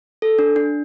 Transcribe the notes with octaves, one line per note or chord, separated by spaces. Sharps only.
A4
D4
D4